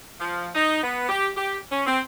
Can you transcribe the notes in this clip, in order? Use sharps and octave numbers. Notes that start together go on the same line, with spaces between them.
F3
D#4
B3
G4
G4
C#4
C4